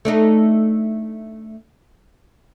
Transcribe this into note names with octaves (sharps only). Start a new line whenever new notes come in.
A3 D4 D#4